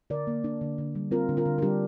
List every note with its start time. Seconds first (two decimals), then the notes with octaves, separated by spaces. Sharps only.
0.10 D3 A#4 D5
0.27 A#3
0.44 D4
0.61 D3
0.78 D3
0.95 G3
1.11 C4 F4 A#4
1.29 D3
1.37 F4 A#4
1.46 D3
1.58 A#4
1.62 G3 D4 G4